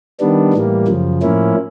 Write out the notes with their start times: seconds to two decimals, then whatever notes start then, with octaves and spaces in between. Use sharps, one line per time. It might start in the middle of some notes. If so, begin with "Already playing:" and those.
0.20 D#3 G3 B3 D4
0.54 A2 E3 G3 A#3
0.88 F#2 C#3 F3
1.22 A2 F3 A#3 C#4 E4